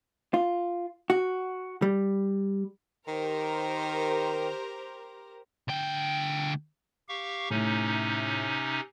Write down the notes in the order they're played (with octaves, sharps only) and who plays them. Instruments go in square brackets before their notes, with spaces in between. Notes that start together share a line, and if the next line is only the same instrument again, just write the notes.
[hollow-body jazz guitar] F4
F#4
G3
[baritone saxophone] D#3 [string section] G4 A#4 C5
[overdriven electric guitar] D2 G5
[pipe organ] G4 F5 C#6
[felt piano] A2 [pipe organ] C3 C#4 D#4